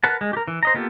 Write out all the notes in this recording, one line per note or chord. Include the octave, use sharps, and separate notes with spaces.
A#4 B4 F#5 A5
G#3
G4 A#4
E3
C5 D#5 A#5
A#3 B3 F4 G4 A4